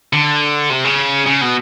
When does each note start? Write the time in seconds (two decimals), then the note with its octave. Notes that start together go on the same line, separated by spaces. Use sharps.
0.13 D3
0.70 C3
0.84 C#3
1.26 C#3
1.41 B2